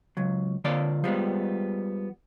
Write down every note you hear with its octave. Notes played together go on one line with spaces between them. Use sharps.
C#2 F#3
D3 F3 A#3 D5
F3 G3 G#3 B3